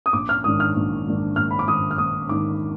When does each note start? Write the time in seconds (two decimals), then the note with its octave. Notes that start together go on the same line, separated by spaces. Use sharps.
0.06 D#6
0.13 A#1 D6
0.29 F6
0.44 G#2 D#3 A#3 D4 D#6
0.60 F6
0.76 A#1
1.06 G#2 D#3 A#3 D4
1.36 A#1 F6
1.51 B5
1.59 D6
1.68 G#2 D#3 A#3 D4 D#6
1.91 F6
1.98 A#1 D#6
2.29 G#2 D#3 A#3 D4 D6